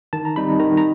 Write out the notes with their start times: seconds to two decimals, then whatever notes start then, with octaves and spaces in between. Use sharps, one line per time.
0.13 D#3 A5
0.25 A#5
0.36 G3 C4 D#4 B5
0.59 D#3 A#5
0.77 A#5